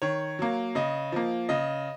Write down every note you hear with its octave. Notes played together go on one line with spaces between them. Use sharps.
D#3 C#5
F#3 A#3
C#3 D#5
F3 A#3
C#3 D#5